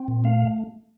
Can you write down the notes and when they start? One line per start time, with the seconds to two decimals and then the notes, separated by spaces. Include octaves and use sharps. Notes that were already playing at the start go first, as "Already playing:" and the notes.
Already playing: C4
0.08 A#2
0.24 A3 F5